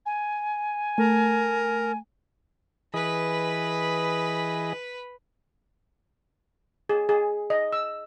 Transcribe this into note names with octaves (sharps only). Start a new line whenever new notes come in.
G#5
A3 A#4
E3 G#4 B4 D#5 B5
G#4
G#4
D#5
E6